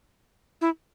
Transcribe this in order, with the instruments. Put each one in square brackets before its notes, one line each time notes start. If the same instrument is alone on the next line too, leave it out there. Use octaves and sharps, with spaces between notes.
[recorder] E4